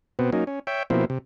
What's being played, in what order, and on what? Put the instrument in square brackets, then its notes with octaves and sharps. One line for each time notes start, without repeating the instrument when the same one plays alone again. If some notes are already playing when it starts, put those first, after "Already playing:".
[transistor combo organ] B2 B3 C4
F#3 A#3 C#4 D#4
C#4
C#5 E5 G5
B2 F3 A#3 C4 E4
C3